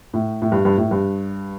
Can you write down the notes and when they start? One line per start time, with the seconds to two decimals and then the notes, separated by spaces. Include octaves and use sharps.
0.14 A2
0.42 A2
0.52 G2
0.65 G2
0.77 A2
0.91 G2